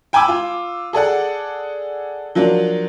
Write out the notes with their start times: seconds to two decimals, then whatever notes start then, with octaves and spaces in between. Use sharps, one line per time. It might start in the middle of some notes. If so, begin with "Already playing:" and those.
0.13 G5 G#5 B5 D6 E6
0.28 F4
0.93 G#4 A4 D5 F#5
2.35 F3 F#3 A#3 D4